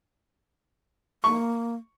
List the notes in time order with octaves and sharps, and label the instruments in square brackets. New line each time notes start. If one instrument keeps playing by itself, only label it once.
[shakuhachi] A#3 [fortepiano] C#6